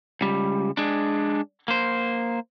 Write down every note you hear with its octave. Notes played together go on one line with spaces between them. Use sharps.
C#2 G3
G#3 D4
A#3 C5